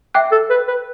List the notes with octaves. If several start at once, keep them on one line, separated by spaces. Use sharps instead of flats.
E5 G5 D6 F#6
A4
B4
B4